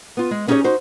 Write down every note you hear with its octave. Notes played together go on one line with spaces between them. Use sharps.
B3 F4
G#3
B3 C#4 D#4 G4 G#4 C#5
D#4 F#4 C5